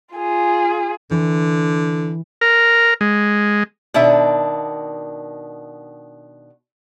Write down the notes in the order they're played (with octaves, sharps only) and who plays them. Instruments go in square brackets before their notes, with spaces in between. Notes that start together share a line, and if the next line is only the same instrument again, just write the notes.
[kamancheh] F4 G#4
[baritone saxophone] D3 [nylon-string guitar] E3
[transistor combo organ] A#4
G#3
[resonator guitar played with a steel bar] B2 D#3 D4 E5